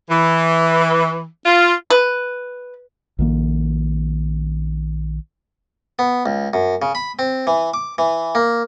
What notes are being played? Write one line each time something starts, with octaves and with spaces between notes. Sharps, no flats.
E3
F4
B4
A#1 D#3 A#3
B3
C#2
F#2
C#3
B5
C4
E3
D6
E3
A#3